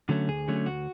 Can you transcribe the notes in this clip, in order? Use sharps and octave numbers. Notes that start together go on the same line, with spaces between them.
D3 F#3 A3 C#4
D2 G#4
D3 F#3 A3 C#4
D2 F#4